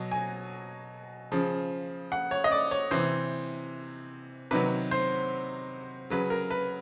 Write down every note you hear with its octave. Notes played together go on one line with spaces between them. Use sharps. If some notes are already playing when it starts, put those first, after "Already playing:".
Already playing: B2 F#3
G#5
C#3 F3
F#5
C#5
D#5
D5
C#5
C3 E3 C5
C3 D#3 F#3 B4
C5
C#3 F#3 B4
A#4
B4